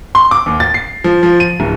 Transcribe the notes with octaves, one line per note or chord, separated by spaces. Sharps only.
C6
D6
D#2
A6
C7
F3
F3
D#7
D1